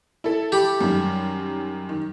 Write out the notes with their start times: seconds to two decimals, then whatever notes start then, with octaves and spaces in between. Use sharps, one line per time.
0.24 E4 A4
0.52 G4 B5
0.81 F#2 D#3 G3
1.89 D#3